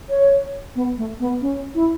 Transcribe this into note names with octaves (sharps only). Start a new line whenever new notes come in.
C#5
B3
A3
B3
C#4
E4